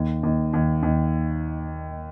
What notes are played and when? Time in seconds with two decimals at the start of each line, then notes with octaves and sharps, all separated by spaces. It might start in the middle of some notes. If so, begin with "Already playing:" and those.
Already playing: D#2
0.23 D#2
0.53 D#2
0.83 D#2